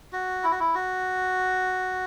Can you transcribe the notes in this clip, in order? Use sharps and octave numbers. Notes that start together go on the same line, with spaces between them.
F#4
E4
F#4
E4
F#4